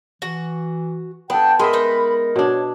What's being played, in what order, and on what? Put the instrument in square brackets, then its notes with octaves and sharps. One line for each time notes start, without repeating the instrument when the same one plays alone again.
[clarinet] E3 [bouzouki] F#4
[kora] B3 A4 [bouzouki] D4 [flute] G5
[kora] G#3 G#4 E5 [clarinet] A#4 [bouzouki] D#5 [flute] B5
[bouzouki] D#4 B4
[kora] B2 D4 [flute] C#5